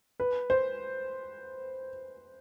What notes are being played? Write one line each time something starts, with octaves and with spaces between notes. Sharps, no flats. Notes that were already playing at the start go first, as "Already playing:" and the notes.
B4
C5